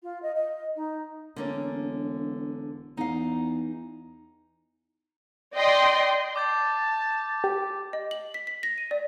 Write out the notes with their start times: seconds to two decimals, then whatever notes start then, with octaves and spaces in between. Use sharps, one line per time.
0.03 F4
0.22 D#5
0.35 D#5
0.76 D#4
1.36 E1 D3 A#3 C#4
2.97 E2 D#4 F5
5.54 D5 D#5 G5 C6
6.36 A5 D6 G6 A6
7.44 G4
7.93 D#5
8.11 F#7
8.34 B6
8.47 B6
8.63 A#6
8.78 D#7
8.91 D5